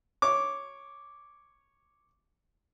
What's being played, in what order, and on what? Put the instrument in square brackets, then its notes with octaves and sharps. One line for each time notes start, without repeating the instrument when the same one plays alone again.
[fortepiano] C#5 D6